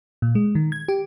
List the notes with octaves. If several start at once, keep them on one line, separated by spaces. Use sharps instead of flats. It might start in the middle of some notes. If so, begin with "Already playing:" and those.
A#2
G#3
D#3
G#6
G4